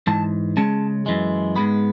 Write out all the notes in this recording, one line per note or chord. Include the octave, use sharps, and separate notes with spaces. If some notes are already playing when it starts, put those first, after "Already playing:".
G#2 E3 A5
C#3 G#3 C#4 A5
F#2 E3 G#3
G#2 G#3 B3 B5